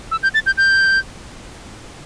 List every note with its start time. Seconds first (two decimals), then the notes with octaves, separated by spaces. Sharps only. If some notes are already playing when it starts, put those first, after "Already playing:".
0.11 E6
0.23 G6
0.34 A6
0.46 G6
0.57 G6